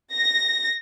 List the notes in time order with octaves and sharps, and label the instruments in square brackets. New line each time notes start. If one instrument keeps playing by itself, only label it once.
[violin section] A#6